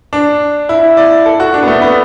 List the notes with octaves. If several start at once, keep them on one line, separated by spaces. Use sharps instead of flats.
D4
E4
D5
A4
F#4
D4
B3
A3
B3